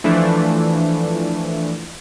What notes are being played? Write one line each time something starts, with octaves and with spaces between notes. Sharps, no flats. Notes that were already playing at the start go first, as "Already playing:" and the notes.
E3 F3 A3 D4